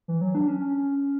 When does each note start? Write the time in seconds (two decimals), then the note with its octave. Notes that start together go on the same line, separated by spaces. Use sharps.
0.08 E3
0.21 F#3
0.35 D4
0.48 C#4
0.60 C#4